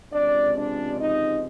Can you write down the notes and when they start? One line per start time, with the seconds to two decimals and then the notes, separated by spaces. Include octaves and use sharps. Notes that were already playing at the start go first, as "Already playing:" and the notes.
0.13 C#2 C3 F3 G#3 D4 D5
0.56 D4 D5
0.99 D#4 D#5